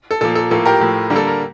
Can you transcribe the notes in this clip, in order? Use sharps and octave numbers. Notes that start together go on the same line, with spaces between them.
A4
A#2 F3 A#3 A4
A4
A2 F3 A#3 A4
G4 A#4
A2 F3 A3
D3 G3 A#3
A4
A#4